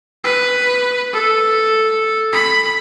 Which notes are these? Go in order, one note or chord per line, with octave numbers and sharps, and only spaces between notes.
B4
A4
B5